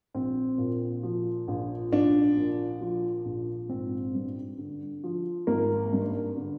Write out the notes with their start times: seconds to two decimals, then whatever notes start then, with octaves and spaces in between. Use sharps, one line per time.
0.14 A#1 C4
0.58 A#2
1.03 F3
1.48 A#1
1.92 A#1 D4
2.37 A#2
2.81 F3
3.25 A#1
3.69 G#1 C4
4.14 G2
4.58 D3
5.04 F3
5.47 G#1 A#3
5.93 G2
6.37 D3